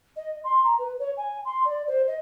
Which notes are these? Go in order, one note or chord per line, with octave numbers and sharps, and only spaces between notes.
D#5
C6
A#5
B4
C#5
G#5
C6
D5
C5
D#5